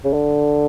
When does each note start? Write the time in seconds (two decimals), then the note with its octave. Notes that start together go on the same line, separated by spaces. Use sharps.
0.05 C#3
0.13 D3